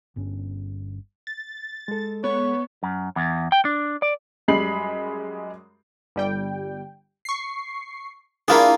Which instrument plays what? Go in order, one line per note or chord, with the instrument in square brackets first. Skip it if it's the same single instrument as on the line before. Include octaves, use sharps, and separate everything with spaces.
[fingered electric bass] G1 G2 C#4
[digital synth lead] A6
[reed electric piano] G#3 A4
[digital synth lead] B3 [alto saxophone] C#5
[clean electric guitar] F#2
E2
G5
D4
D5
[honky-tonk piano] F#2 G3 G#3 B5 C7 F#7
[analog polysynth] G1 G3 G5
C#6 C7
[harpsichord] A#3 F4 G#4 [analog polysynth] D4 E4